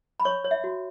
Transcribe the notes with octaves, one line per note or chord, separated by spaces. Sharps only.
B5
C#5 C#6
C#5
E5
F#4